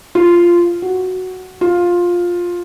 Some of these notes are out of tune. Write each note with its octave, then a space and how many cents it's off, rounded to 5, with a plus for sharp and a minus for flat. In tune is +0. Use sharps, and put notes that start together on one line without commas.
F4 -10
F#4 +0
F4 +10